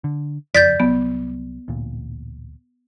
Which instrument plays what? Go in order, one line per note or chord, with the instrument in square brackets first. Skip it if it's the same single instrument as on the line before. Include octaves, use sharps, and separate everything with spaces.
[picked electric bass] D3
[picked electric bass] F#1 F2 [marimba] D5 [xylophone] G6 A6 B6
[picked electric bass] C2 F#3 [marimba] B3
[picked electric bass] A1 D2 A#2